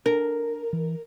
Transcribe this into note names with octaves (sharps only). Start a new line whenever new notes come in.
D4 A#4
E3